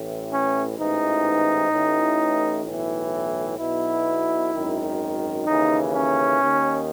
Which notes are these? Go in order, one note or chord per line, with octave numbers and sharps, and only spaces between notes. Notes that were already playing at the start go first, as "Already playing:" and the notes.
Already playing: A1 A2 E3
C#4
A1 G#2 E3 D#4
A1 A2 E3
B1 A2 E3
B1 B2 E4
G#1 F#2 D#3
D#2 C#3 E3 D#4
C#4
D#2 D#3